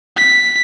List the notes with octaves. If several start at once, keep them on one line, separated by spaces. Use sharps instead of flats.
B6